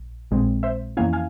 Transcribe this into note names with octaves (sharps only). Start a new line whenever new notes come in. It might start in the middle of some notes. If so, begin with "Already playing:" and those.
Already playing: A#1
A#1 A#2 G#3 C4
C5 E5
F2 E3 A#3 C#4 E4 F5 G#5
F5 G#5